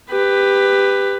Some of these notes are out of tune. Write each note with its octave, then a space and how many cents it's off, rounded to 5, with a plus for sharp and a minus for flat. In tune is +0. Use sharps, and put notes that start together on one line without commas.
G4 +15 B4 +10